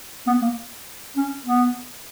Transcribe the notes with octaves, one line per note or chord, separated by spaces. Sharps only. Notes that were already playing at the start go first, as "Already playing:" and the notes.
B3
A#3
C#4
B3